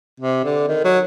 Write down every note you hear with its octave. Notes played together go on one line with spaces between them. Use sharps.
C3
D3
D#3
F#3